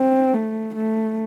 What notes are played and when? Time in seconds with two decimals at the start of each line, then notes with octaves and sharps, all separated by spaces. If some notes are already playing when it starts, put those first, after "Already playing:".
Already playing: C4
0.34 A3
0.75 A3